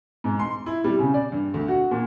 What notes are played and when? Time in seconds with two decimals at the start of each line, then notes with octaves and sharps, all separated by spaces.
0.24 G#2
0.39 C6
0.66 E4
0.84 G3
0.99 C#3
1.14 D5
1.32 G2
1.54 D2
1.68 F#4
1.91 A#2